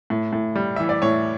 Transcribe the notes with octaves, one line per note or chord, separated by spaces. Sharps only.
A2
A2
G3
E3 E5
D5
A2 C#5